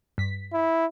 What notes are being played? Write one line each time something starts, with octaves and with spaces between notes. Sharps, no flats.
G2 B6
E4